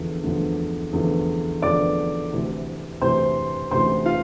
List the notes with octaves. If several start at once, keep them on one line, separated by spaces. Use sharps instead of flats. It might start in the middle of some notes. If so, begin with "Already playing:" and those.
Already playing: E2 D3 F3
E2 D3 F3
E2 D3 F3
E2 D3 F3 D5 D6
D2 C3 E3
D2 C3 E3 C5 C6
D2 C3 E3 C5 C6
F4 F5